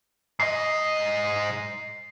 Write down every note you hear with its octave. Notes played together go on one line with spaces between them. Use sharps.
G#2 D#5 C7